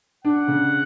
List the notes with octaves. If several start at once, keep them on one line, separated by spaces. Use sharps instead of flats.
D4 F#5
C#3